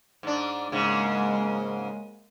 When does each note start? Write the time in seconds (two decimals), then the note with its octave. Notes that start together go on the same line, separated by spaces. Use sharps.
0.23 G#2 D4
0.72 G#2 C#3 G#3 A#3